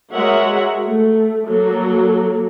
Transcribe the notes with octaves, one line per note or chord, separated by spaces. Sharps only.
G#3 F#4 A#4 C#5 E5 F#5
A3
F#3 A#3 A4